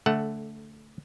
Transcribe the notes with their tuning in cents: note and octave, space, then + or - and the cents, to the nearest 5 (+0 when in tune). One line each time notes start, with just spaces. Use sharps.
D3 -25 A3 +0 F#5 +5